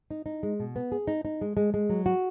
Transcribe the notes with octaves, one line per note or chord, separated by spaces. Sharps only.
D#4
D#4
G#3
B2
B3
G#4
D#4
D#4
G#3
G#3
G#3
F#3
F#4